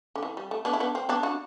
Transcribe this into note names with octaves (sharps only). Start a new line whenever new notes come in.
D3
E3
G3
A3
B3 D4
E4
B3 D4
C4
B3 D4
D4 F#4